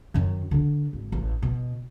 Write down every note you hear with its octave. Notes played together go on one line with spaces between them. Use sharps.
F#2 D#3
D3 D4
G#1
A1
B2